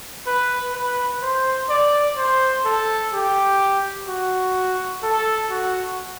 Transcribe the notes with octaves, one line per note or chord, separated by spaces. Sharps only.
B4
B4
C5
D5
C5
A4
G4
F#4
A4
F#4